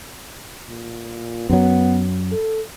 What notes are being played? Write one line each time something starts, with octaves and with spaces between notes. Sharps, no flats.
A#2
F#2 F#3 B3
A4